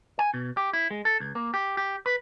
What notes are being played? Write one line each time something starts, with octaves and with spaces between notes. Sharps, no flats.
G#5
B2
G4
E4
G#3
A4
C#2
A#3
G4
G4
B4